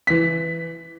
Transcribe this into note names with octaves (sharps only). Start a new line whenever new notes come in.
E3 B6